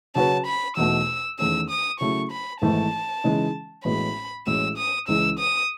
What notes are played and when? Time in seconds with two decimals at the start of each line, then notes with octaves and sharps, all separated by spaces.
0.15 C#3 F#3 C#4 F#4 B4 A5
0.47 B5
0.77 E2 B2 A3 D#4 F#4 E6
1.39 E2 D#3 A3 C#4 G#4 E6
1.70 D#6
2.00 C#3 F#3 A3 E4 C#6
2.31 B5
2.62 G#1 G#2 E3 A3 A5
3.24 C#3 E3 G#3 D#4
3.85 A1 A2 G#3 B3 F#4 B5
4.47 A1 A2 G#3 C#4 F#4 E6
4.77 D#6
5.08 C#2 C#3 E3 G#3 E6
5.39 D#6